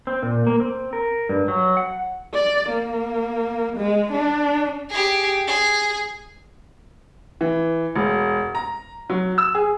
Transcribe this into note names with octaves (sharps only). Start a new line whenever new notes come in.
C4
A#2
A#3
C4
A#4
G2
F#3
F#5
D5
A#3
G#3
D4
G4 G#4
G#4
E3
E1
A#5
F#3
E6
G#4